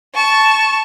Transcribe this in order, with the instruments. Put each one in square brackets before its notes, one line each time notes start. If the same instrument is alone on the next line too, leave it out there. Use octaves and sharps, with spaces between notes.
[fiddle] A5 C#6